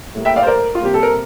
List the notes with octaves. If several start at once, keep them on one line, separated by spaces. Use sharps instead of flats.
A2 G3 A#3
E5 G5
D5 F5
C5
A#4 D5
F4
C3 G3 A#3 G4
A4
A#4